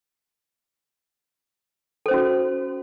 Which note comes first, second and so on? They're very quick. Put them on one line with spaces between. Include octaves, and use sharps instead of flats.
A4 C5 C#4 F#4